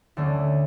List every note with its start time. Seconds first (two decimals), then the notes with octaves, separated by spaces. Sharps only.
0.17 D2 D3 A3 C#4